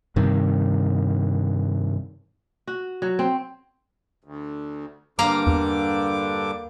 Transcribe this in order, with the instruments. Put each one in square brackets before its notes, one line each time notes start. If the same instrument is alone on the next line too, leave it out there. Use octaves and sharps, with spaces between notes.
[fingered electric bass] G2 C3 D#3
[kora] F#4
F#3
C4
[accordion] D2
[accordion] G2 D3 D6 [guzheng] A#3 A#4 F5
[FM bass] E2